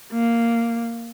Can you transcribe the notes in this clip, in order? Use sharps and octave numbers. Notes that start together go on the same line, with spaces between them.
A#3